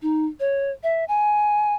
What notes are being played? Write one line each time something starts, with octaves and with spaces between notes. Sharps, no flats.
D#4
C#5
E5
G#5